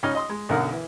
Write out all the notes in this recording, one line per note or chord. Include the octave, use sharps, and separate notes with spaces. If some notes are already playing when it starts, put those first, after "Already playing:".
C#2 C#4 D#4 D#5 F6
D#5 C6 D#6
G#3
B1 F#2 D3 D#4 A#4 F#5
E3